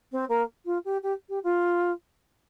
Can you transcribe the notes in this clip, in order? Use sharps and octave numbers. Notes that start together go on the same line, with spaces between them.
C4
A#3
F4
G4
G4
G4
F4